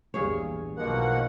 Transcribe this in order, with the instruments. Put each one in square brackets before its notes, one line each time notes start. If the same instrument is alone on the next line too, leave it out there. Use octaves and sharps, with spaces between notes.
[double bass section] A#1 E2 [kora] G2 G#4 C#5
[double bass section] B1 [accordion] B2 F3 F#5 [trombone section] D#3 A#3